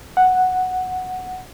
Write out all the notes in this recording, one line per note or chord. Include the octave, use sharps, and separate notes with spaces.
F#5